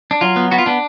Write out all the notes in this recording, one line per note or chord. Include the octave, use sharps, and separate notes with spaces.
D4
F#3 F4
B3
B3 F#4
F4
B3 D4